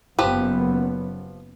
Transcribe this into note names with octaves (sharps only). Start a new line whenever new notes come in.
F#1 F#2 F3 B3 G4 B4